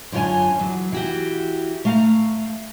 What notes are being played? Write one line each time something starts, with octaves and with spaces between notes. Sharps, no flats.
F#2 D3 F4 C#5 G#5
E2 F#3
E3 F#4 G4
A3 F5 A#5